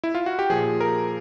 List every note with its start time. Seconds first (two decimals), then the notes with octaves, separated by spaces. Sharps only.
0.04 E4
0.15 F4
0.26 F#4
0.39 G4
0.50 A#2 F3 G#4
0.81 A#4